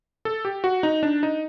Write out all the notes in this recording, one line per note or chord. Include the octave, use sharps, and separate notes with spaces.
A4
G4
F#4
D#4
D4
D#4